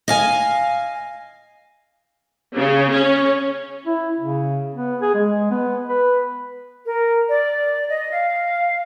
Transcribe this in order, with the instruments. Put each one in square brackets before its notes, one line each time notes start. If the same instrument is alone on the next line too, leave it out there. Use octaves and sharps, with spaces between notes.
[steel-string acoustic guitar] D#5 F5 G#5
[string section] C#3
C#4
[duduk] E4
C#3
B3
G#4
G#3
B3
B4
[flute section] A#4
D5
D#5
F5